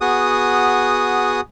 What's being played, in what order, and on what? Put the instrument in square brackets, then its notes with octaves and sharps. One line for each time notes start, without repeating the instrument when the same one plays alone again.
[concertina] B3 F#4 G#4 D#6